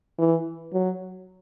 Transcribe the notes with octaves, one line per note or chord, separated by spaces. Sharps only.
E3
F#3